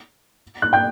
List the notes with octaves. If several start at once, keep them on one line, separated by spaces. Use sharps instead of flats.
F#6
G5 G6